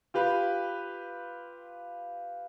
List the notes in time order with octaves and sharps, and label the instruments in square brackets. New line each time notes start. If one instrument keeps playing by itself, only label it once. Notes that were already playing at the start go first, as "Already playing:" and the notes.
[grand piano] F4 G4 B4